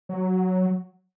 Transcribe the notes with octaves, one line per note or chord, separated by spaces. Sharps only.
F#3